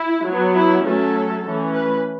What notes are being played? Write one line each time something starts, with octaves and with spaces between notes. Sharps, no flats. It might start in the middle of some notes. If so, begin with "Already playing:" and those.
Already playing: E4
F#3 B3
E4
F#3 A3 C#4 A4
E3 A3 C#4
B4